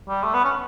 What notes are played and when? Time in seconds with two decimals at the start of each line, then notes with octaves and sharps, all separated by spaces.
0.09 G3
0.23 A3
0.34 B3
0.44 C#4